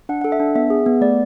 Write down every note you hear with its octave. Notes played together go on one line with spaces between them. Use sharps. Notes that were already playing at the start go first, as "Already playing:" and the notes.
D4 F#5
A4 F#5
E5
D4
B3 E5
G#4
B3
A3 D5